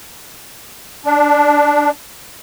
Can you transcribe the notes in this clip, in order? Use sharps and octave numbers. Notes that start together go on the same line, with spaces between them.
D4